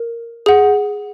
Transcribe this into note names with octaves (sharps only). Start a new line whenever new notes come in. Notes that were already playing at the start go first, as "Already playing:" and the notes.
Already playing: A#4
G#4 F#5